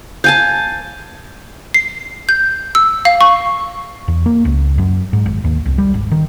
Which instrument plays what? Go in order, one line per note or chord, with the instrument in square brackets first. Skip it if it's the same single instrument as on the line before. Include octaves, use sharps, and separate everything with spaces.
[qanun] F5 G#5 A5 [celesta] G6
[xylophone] C7
G6
E6
F5
C#6
[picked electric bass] E2
A#3
C#2
F#2
G#2
G#1
D#2
C2
G3
G#1
D#3